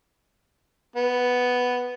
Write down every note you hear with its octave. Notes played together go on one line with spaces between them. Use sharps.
B3